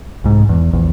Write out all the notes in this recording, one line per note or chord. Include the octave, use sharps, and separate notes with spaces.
C2 G#2
E2
A#1 E2